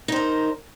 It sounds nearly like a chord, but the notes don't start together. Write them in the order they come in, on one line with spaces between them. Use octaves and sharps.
D#4 C5 A#4